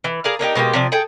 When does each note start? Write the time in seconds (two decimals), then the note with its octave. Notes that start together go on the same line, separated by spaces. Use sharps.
0.04 E3
0.24 G#4 A#4 D5 F5
0.39 A#3 D4 D#4 G4
0.55 B2 G#3 A#3 G4
0.73 C3 F3 D5
0.92 G#4 A4 G5